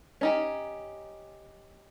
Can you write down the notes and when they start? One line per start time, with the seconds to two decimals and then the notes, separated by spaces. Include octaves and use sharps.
0.21 C#4 D#4 G4